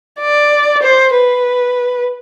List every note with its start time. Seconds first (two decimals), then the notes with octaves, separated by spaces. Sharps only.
0.19 D5
0.82 C5
1.15 B4